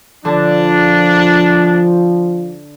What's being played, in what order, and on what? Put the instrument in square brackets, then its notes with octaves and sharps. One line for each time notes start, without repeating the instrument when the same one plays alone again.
[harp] D3 [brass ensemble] F3 [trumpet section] D4